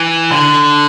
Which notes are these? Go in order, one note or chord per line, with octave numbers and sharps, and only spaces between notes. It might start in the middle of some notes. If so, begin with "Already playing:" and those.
Already playing: E3
D3